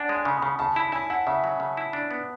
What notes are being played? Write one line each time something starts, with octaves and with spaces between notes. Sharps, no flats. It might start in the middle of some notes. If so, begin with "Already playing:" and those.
Already playing: D4 F#5 G#5 A5
G#3
G#5
C#3
B5
C#3
C#3 A5
E4 B5
E4 G#5
E4 F#5
C#3 E5
F#3
C#3
E4
D4
B3